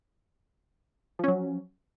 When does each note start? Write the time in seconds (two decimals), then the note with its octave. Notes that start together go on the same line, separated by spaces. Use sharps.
1.19 F3
1.24 C#4
1.28 F#3